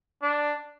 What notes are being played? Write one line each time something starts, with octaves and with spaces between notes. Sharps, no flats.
D4